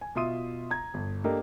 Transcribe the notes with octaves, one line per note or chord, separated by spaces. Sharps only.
G#5
B2 F4 E5 C6 D#6 D#7
A#5 G#6
G1
A#3 D4 G4 A4 A#4 D#5